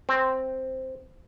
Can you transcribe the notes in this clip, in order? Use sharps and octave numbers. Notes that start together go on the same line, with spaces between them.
C4